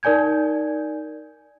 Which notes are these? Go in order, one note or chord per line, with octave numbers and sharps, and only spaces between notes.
D#4 A#4 D5 G#5 G6 G#6